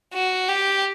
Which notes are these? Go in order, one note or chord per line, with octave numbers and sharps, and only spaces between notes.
F#4
G4